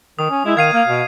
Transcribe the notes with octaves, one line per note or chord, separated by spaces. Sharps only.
D#3 D#6
C#4
G#3 E4
D#3 F5 G#6 C7 D#7
A#3
B2